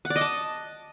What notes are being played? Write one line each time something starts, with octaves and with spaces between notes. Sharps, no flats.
F#5
D5
D#5
A5